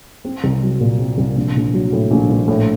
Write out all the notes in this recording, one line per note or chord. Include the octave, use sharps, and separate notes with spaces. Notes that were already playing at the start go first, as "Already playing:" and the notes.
C4
C2
F#3
A#2
C4
C2
A#1
A#1
F#3
A2
A#1
A#1
A2